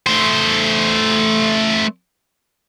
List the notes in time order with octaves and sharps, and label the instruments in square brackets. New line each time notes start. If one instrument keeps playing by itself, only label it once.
[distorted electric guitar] A3 C5